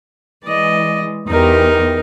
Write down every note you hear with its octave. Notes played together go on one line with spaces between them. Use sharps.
E3 G#3 D5 D#5
E2 D#4 G4 A#4